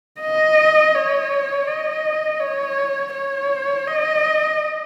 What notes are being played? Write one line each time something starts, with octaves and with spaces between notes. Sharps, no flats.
D#5
C#5
D#5
C#5
C#5
D#5